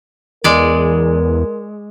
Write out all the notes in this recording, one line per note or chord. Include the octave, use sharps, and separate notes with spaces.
E2 G#3 A#4 D5